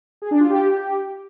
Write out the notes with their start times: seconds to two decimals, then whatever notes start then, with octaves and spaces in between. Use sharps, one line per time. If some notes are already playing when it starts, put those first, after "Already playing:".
0.22 G#4
0.31 D4
0.40 F4
0.50 G4